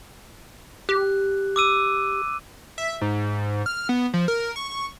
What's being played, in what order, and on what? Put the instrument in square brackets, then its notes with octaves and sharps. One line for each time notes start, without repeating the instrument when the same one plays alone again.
[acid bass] G4 [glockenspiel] F#6
[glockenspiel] D6 E6 D#7
[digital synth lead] E5
G#2
F6
B3
F3
A#4
C#6